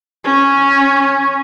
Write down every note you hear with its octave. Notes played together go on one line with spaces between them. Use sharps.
C#4